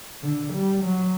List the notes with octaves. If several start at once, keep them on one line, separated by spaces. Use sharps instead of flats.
D3
G3
F#3